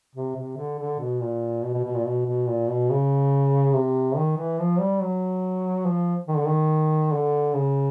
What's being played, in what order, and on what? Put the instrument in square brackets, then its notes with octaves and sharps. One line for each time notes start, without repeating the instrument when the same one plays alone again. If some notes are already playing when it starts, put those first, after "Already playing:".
[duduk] C3
C3
D3
D3
B2
A#2
B2
B2
B2
A#2
B2
B2
A#2
B2
C#3
C3
D#3
E3
F3
G3
F#3
F3
D#3
D3
D#3
D3
C#3